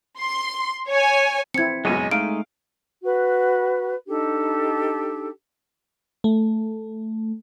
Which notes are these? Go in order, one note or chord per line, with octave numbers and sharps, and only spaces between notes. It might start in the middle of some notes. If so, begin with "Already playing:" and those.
C6
C#5 G#5
C4 E4 G#6 C#7
C#2 F#2 B2 G#3 G#4 C#5 G#5
G#3 A3 D#4 F5 D7
F#4 B4
D4 D#4 G4 A4
A3